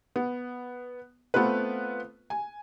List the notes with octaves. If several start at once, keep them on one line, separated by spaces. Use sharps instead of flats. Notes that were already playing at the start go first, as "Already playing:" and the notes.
B3
A3 B3 C4 F4 B4
G#5